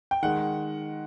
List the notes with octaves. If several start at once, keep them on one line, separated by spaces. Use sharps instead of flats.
G5
D#3 G#3 F#5